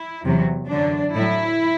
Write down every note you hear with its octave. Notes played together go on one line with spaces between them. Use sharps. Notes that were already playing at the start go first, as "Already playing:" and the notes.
Already playing: E4
E2 C3 F#3
F#2 D3 F#3 D4
A2 F#3 E4